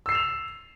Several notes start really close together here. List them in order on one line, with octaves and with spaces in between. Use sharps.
E6 C7 E7 F7